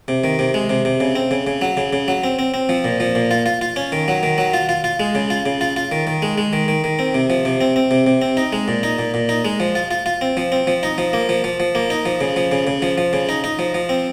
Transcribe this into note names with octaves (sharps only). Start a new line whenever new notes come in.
C3
D#3
C3
G#3
C3
C3
C#3
C4
C#3
C#3
F#3
C#3
C#3
F#3
C4
C4
C4
F3
A#2
F3
A#2
F4
F4
F4
C#4
D#3
F#3
D#3
F#3
F4
F4
F4
G#3
C#3
F4
C#3
F4
F4
D#3
D#3
G#3
G#3
D#3
D#3
D#3
C4
C3
F3
C3
C4
C4
C3
C3
C4
D#4
G#3
A#2
D#4
A#2
A#2
D#4
G#3
F3
F4
F4
F4
C4
F3
C4
F3
D#4
F3
A#3
F3
F3
F3
A#3
D#4
F3
C#3
F3
C#3
C#3
F3
F3
C#3
D#4
D#4
F3
F3
C4